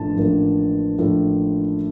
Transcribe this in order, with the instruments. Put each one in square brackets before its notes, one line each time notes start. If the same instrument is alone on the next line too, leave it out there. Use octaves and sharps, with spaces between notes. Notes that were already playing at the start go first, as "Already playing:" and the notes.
Already playing: [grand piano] A1 A2 F3 A#3 D4 A5
A1 A2 F3 A#3 D4
A2 F3 A#3 D4